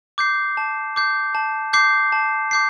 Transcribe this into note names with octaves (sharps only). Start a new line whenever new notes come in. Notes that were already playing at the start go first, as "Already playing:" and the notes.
D6 G6 C7
A5
D6 G6 C7
A5
D6 G6 C7
A5
D6 G6 C7